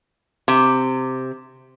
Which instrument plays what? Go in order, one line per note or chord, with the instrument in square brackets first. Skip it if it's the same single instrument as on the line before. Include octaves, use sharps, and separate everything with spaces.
[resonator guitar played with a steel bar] C3